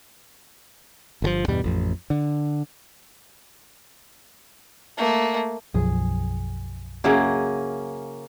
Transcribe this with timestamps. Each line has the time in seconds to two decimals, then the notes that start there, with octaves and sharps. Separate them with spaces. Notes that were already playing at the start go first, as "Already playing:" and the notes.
1.22 G1 D3 F3
1.48 E2 G2 B2 G3
1.64 A1 F2
2.10 D3
4.97 A3 A#3
5.74 B1 F#2 F3 G#4
7.04 C#3 F#3 A#3 C#4 E4 G#4